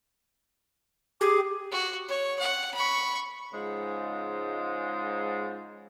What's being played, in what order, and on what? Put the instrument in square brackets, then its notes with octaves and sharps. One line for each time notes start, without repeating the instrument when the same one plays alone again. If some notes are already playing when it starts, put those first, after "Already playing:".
[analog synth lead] G4 [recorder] G#4 [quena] D6
[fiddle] F#4
C#5
F#5
B5 C#6
[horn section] G#2 C#3 F3 G#3